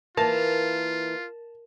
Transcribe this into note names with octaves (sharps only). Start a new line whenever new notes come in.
E3 A#3 F4 A#4 A5